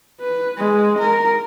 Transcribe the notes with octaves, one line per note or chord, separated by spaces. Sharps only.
B4
G#3
A#4